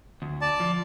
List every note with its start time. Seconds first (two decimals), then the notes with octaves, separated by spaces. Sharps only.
0.22 D2
0.41 D5 A5
0.60 F3